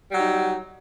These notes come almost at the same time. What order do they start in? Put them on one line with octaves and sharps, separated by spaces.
G3 F#3 D#4